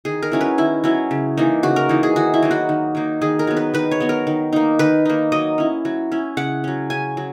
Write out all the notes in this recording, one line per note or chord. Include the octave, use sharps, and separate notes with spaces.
D#3 G#4
A#4
F#3 C#4 E4
B4
D#3 E4
F#3 C#4 E4
C#3
E3 A#3 D#4
C#3 F#4
A#4
E3 A#3 D#4
G#4
D#3 F#4
E4
F#3 A#3 D#4
F#4
D#3
F#3 A#3 D#4
D#3 G#4
A#4
F#3 B3
B4
D#3 B4
C#5
F#3 B3
A#4
D#3
A#3 D#4
D#3 B4
A#3 D#4
F#3 D#5
C#4 E4
F#3
C#4 E4
C#3 F#5
F#3 C#4
C#3 G#5
F#3